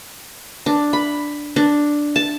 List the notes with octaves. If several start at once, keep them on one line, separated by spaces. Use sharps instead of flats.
D4
B5
D4
A5